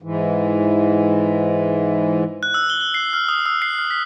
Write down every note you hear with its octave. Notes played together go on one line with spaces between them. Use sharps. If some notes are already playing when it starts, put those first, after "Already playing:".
G#2 E3
F#6
E6
G7
G7
C7
F6
D#6
E6
C7
F6
B6